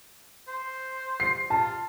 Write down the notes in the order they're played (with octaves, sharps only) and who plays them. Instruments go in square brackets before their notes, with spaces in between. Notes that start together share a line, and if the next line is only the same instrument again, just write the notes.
[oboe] C5
[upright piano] C7
[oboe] F4 [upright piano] A5